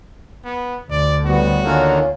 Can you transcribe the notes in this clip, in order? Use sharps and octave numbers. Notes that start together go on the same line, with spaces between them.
B3
D2 D5
A2 G3 B3 F#4
D3 D#3 A#3 C#4 F4